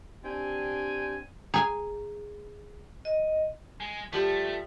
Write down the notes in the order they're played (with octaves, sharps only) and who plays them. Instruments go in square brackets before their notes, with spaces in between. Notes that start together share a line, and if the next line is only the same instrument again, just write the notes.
[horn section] C4 D4 G4 G5 G#5
[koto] G#4 G#5 [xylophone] A#5
[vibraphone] D#5
[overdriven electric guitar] G#3
[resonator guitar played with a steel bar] F3 G3 G4 [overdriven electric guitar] A3